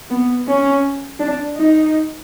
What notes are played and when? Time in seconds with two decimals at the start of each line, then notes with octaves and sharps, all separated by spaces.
0.10 B3
0.47 C#4
1.20 D4
1.57 D#4